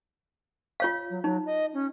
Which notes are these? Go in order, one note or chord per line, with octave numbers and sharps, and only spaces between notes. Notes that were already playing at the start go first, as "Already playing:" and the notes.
F4 C#5 F5
F#3
F#3 D#4
D#5
C#4